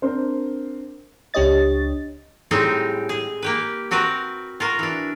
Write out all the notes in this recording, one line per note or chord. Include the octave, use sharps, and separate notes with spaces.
C4 D4 A#4 C5
C#2 D4 G4 C#5 D#5 A6
A2 G3 G#3 C4 D#4
G#4
A#3 G4 B4
C4 F#4 A#4 B4
F4 F#4 A#4
E3 D4